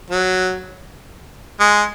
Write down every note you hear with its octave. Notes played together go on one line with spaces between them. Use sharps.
F#3
G#3